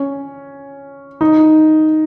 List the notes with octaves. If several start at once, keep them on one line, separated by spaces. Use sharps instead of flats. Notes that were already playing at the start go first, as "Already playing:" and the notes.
Already playing: C#4
D#4